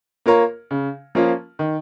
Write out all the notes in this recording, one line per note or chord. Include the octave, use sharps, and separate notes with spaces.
A#3 F4 A#4 C#5
C#3
F3 A#3 C#4 F4
D#3